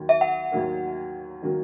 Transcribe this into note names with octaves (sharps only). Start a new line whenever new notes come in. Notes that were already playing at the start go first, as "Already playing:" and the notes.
Already playing: D#2 D#3 F#3 A#3
E5
F#5
D#2 D#3 F#3 A#3
D#3 F#3 A#3